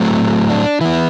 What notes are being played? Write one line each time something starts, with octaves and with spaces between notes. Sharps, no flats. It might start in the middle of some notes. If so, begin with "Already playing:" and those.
Already playing: A2 F#3 A3 C4
D4
E3 B3 E4